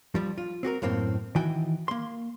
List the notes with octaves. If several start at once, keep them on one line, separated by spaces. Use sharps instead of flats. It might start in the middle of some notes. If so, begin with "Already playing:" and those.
F3 G3
F4
C4 F#4 G4 A#4
F#2 A2 A#3 C4
D#3 E3 E4 F#4 G5 G#5
A#3 C6